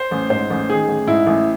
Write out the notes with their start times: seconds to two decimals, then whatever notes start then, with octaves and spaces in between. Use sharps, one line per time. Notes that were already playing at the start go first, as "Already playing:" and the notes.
Already playing: C5
0.11 A1
0.30 G#2 C5
0.50 A1
0.69 D#3 G#4
0.88 A1
1.07 G#2 E4
1.27 A1